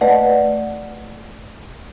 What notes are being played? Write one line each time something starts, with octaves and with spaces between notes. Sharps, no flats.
A3 B4 D5 D#5 F#5